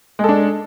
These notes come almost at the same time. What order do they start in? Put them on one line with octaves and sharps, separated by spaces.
G#3 A4 D4